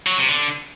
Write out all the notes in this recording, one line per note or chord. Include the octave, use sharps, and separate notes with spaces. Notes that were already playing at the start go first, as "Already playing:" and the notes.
F#3
C3
D3